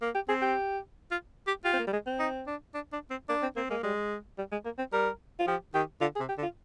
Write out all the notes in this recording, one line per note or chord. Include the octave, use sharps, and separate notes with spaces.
A#3
G4
C4 G#4
G4
F4
G4
F4 G4
C4
A#3
G3
G#3
C4
D#4
D4
D4
D4
C4
A#3 D4
C4
A#3 C4
G#3 A#3
G3 G#3
G3
G#3
A#3
C4
G3 A#4
F4
F3 G4
D#3 G4
D3 F4
G#4
C3
G4
D3
F4